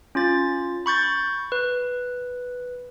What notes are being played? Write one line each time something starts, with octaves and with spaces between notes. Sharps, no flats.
C#4 F4 A6
B5 C#6 G6 A6
B4